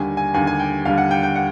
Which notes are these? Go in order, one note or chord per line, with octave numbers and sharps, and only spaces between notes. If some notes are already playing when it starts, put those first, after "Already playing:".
Already playing: D#2 D3 G3 G#5
G#5
D#2 D3 G3 G#5
G#5
G5
D#2 D3 G3 F5
F#5
G5
G5
F#5